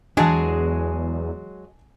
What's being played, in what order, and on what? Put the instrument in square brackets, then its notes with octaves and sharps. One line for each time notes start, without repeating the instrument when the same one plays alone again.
[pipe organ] E2 [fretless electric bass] E3 D4 [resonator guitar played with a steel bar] F#3 G#3 G#4 [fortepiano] G#5 A5